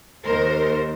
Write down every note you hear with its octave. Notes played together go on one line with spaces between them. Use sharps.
D#2 A#4 C5